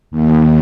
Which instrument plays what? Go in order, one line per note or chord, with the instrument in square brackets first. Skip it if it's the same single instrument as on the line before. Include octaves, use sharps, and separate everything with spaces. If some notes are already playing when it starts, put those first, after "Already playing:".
[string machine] D#2